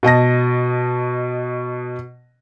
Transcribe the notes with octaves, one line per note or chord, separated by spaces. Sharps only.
B2 D#5 A5 A#6